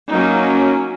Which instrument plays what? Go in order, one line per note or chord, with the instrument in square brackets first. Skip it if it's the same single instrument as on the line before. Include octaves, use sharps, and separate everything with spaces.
[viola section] F#3 A#3 C#4 D#4